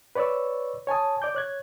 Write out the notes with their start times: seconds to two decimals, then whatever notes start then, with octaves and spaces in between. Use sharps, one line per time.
0.15 B4 C#5 D5 C#6 E6
0.87 C#5 G#5 A5 D#6
1.22 D5 D6 G6
1.35 C#5 F#6 G#6